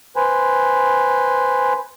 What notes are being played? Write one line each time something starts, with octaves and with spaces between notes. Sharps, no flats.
B4 C5 G#5